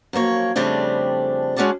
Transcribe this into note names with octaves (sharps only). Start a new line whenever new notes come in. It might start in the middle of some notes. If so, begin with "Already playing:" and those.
F#2 F3 A#3 C#5
F2 C#3 G3 A3 C4 D4
G#3 C#4 F#4 G#4 D5 A5